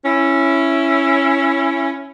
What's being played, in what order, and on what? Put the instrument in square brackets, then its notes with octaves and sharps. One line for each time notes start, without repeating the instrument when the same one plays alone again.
[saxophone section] C#4 E4